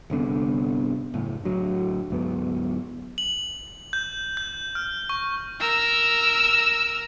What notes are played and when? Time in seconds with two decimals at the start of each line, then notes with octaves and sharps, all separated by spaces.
0.10 G1 C2 D3 B3
1.14 F#1 A2
1.45 D1 D2 F#3
2.10 D2 G#2 F#3 B3
3.18 F#7
3.93 G6
4.37 G6
4.75 F6
5.09 C#6
5.60 A#4 E6